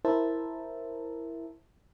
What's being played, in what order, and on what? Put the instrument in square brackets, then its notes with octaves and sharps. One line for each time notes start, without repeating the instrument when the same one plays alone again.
[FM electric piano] E4 A#4 C5 E5 A5